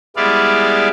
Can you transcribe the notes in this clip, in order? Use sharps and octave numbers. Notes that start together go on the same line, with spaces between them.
G3 G#3 B3 E4 D5 F5